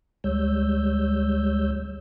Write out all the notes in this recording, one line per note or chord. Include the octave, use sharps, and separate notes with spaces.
D2 G3 G#3 C#5 E6 G6